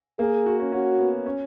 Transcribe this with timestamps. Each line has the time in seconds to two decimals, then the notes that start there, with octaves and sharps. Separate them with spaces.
0.19 A#3 G#4
0.46 F#4
0.60 C#4
0.72 C#4 F#4
0.99 B3
1.26 C#4